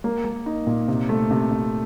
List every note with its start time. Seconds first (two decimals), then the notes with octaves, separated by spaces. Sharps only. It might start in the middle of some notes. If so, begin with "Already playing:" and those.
0.04 A#3
0.25 A#3
0.46 D#4
0.67 A#2
0.88 C3
1.09 A3
1.31 C3
1.51 C3